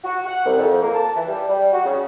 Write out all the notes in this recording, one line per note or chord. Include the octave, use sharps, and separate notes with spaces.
F#4
F#5
C2
F2
A#3
A5
E3
G3
G3
F#4
C#3